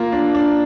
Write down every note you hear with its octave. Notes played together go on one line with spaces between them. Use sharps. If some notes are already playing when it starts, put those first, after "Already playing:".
Already playing: A#3 F4
D4
D4